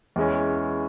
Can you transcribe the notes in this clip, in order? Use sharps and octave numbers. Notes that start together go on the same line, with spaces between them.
E2 E3 G#3 C#4